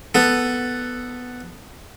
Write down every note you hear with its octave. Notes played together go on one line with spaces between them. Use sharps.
B3 A4